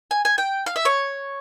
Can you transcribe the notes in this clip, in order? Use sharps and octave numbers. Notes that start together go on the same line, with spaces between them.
G#5
G#5
G5
F5
E5
C#5